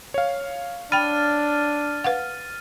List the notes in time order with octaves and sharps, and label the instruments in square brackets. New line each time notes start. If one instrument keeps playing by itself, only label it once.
[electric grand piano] C#5 F5
[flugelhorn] D4 [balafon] G5 B5 [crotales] F6 A6 D#7
[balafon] B4 F5 F#5